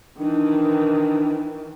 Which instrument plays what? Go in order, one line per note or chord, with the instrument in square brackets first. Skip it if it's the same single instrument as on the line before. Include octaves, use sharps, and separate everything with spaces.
[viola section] D#3 E3 [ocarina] D4